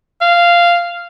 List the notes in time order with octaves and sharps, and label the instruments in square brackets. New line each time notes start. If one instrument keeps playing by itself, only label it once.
[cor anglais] F5